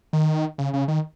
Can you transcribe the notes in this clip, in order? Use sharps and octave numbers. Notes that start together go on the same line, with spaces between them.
D#3
C#3
C#3
D#3